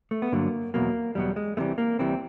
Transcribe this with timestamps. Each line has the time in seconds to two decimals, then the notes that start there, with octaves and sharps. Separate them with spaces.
0.11 A3
0.22 B3
0.32 G2 D3 F#3 A#3
0.74 E2 B2 F#3 A#3
1.15 E2 B2 F#3 G3
1.36 G#3
1.57 C2 C3 E3 G3 A3
1.78 A#3
1.99 C2 C3 E3 G3 C4